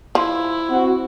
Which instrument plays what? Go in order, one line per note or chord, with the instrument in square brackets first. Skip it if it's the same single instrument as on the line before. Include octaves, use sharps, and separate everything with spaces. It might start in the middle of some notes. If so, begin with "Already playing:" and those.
[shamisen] F3 [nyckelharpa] E4
[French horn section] C4 F#4